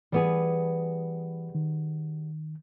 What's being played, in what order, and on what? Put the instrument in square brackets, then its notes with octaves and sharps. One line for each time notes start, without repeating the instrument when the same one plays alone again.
[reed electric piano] E3 [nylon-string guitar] G3 B3 G#4
[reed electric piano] D#3